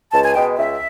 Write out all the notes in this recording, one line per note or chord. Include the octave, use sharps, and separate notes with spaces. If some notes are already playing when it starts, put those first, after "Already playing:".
C#2 A5
G#5
B2 G#3 G5
C#2 E5